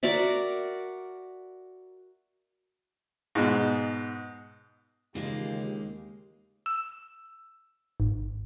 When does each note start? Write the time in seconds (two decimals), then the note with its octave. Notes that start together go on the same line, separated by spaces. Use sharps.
0.03 F#4 A#4 D5 E5
3.35 G#2 B2
5.15 D#2 C#3 E3 G#3 A#3 F4 G4
6.66 E6
8.00 G#1